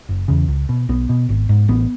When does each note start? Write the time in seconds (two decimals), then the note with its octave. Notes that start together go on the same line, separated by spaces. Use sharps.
0.09 F#1
0.28 E2 C#3
0.48 C#2
0.69 B2
0.89 B1 B3
1.09 B2
1.29 G#1
1.49 G#2
1.68 A1 B3